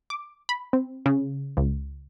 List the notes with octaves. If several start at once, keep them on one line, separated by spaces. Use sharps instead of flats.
D6
B5
C4
C#3
C#2